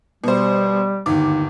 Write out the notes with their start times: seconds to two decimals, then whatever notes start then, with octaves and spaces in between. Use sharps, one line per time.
0.24 B2 G3 C5
1.06 G1 D#2 G#2 D6